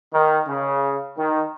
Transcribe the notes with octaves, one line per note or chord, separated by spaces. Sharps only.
D#3
C#3
D#3